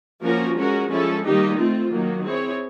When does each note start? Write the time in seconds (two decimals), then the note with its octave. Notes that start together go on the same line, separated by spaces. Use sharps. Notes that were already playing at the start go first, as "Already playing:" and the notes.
0.22 F3 A#3 C#4 F#4 A#4
0.56 G#3 C#4 F#4 A#4
0.90 F3 G#3 C#4 E4 A4
1.24 D#3 G3 A#3 D#4 G4
1.58 A3 C4 F4
1.91 D#3 F#3 A#3
2.24 C4 E4 G#4 C#5